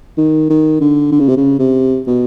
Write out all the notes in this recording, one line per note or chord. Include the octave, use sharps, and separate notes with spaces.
D#3
D#3
D3
D3
C#3
C3
C#3
C3
B2